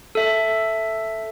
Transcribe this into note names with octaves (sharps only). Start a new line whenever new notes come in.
A4 E5